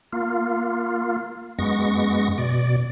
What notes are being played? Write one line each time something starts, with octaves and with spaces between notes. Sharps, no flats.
A#3 F4
F#2 G#3 B3 C#6 A#6
B2 D5